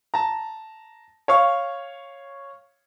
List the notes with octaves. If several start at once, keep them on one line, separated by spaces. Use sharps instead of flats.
A5 A#5
C#5 F5 C#6